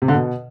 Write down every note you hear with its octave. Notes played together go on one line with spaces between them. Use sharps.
C3
D3
B2